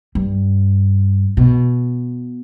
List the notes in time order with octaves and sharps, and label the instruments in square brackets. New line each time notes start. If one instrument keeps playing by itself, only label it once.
[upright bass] G2
B2